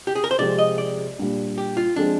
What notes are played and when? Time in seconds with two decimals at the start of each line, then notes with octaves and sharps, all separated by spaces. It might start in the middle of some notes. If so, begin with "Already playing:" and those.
0.07 G4
0.15 G#4
0.24 A#4
0.31 C5
0.39 C3 F3 G#3 C4 F4 D5
0.59 D#5
0.78 D5
1.19 A#2 G3 D4
1.58 G4
1.77 F4
1.96 F3 G#3 C4 D4